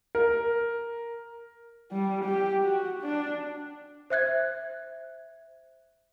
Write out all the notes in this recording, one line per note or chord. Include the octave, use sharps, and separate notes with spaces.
A#4
G3
G4
F#4
D4
C5 E5 F#6 G#6